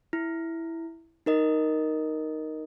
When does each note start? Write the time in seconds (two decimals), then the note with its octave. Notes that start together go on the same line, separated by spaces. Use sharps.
0.13 E4
1.26 D#4 A#4 D#5